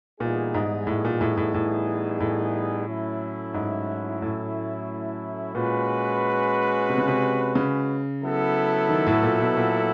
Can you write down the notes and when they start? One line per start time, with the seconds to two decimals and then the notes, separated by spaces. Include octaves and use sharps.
0.20 A#2 E3 G3 B3 D#4 G#4
0.54 G#2
0.87 A2
1.05 A#2
1.21 A2
1.37 A2
1.54 A2
2.20 A2
2.88 F#3 A3 C#4 E4
3.54 G#2
4.22 A2
5.55 A#2 G#3 C#4 F#4 B4
6.90 C3
6.98 C#3
7.08 C3
7.55 C#3
8.22 F#3 B3 E4 A4
8.89 D#3
9.07 A2
9.23 A#2
9.40 B2
9.57 A#2